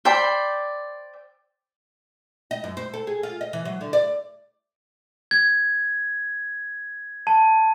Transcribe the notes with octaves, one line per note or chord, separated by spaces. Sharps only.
C5 D5 G5 B5
D#5
F#2
C5
A4
G#4
F4
D#5
E3
F#3
D3
D5
G#6
A5